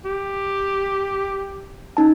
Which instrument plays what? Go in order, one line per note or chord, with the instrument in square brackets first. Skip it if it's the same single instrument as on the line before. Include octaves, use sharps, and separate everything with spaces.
[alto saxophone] G4
[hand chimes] C#4 D#4 A5